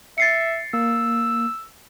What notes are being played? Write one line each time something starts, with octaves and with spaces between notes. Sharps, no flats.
E5 A6 C7 C#7
A#3 E6